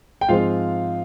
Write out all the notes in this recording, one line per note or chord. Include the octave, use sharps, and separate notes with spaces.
G5
G#2 F3 G#3 C4 F4 F5